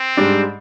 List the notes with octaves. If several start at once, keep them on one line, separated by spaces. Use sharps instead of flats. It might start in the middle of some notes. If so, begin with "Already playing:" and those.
Already playing: C4
G#2 G3 D4